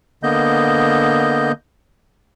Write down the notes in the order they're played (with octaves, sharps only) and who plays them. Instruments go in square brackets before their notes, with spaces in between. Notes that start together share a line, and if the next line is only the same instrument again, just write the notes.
[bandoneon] D3 A#3 B3 D#5 G6